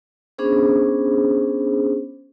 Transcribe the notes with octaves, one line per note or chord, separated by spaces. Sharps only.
B3 C#4 D4 G#4 C5